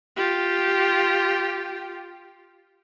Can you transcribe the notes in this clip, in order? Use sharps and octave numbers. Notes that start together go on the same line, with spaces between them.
F4 G4